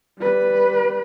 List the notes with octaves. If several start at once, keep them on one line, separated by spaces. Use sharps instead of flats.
G3 B4